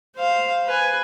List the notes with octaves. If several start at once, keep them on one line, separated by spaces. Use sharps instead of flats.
C5 F5
B4 G#5